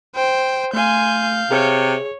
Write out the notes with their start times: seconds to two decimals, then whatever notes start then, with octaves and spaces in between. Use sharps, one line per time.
0.15 C5 G5
0.74 A3 F5 G#5 C6 G6
1.51 C3 G#4 C#5